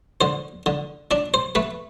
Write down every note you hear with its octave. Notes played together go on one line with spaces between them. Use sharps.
D3 C5
D3
D4 D5
C5
A3 B4